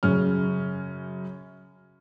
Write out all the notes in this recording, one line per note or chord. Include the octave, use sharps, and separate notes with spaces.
F#2 C#3 C#4 F6